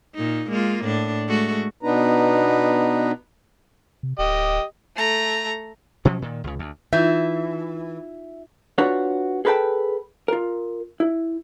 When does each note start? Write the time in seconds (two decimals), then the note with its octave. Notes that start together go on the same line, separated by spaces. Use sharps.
0.15 A#2 D#4
0.49 G#3 A#3 F4
0.84 A2 D4
1.27 G#3 A3 F#4
1.83 B2 B3 D4 D#4 B4 A#5
4.03 C3
4.19 D1 G4 D#5
4.96 A3 A#5
6.05 B2 F3 F#3 C#4
6.22 A#2 D#3
6.44 C#2 C#3
6.59 D2
6.93 E3 D#4 F4 E5 G6
8.78 D4 F4 F#4 B4 C#5
9.45 G#4 A4 B4 C#5 G5 A5
10.28 F4 A#4
11.00 E4